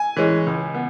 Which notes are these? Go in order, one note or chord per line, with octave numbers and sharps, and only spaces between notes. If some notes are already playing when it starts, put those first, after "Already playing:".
Already playing: G#5
E3 G#3 C#4
C#2
B3